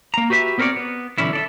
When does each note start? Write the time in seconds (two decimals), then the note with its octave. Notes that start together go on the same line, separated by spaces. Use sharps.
0.14 A#3 A#5
0.30 F#4 G4 B4 D#5 E5
0.58 B3 C4 A#4 B4 C#5 D5
0.76 B3
1.18 B1 D3 E3 C#4 E4
1.33 A4 D5 E5